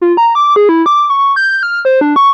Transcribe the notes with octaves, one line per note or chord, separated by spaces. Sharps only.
F4
A#5
D6
G#4
E4
D6
C#6
G6
F6
C5
D4
C#6